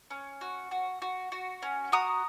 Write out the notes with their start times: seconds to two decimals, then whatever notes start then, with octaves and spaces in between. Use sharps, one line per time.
0.11 C#4
0.41 F#4
0.71 F#4
1.02 F#4
1.32 F#4
1.62 C#4
1.92 F#4 A#5 D#6